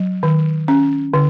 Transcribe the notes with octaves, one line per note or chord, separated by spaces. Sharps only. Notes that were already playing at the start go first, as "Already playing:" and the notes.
Already playing: F#3
D#3
C#4
D3